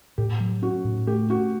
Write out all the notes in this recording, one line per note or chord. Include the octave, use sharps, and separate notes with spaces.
A2 G4
F#3
C#4 F#4
A2
A3 G4
C#4 F#4